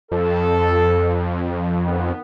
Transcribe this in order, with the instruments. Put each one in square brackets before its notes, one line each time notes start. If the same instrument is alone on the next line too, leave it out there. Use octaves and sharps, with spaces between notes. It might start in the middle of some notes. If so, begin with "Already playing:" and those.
[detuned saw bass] F2 [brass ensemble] A4
[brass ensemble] D#3 B3